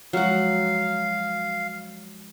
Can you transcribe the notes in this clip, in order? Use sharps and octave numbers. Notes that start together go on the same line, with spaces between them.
F3 F#3 G#3 F#4 F5 F#5